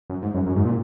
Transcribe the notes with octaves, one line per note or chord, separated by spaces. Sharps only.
F#2
G#2
F#2
F#2
G#2
A#2